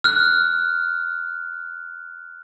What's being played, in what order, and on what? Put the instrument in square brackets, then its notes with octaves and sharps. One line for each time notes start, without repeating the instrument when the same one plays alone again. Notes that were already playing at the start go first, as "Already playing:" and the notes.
[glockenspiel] F6 F#6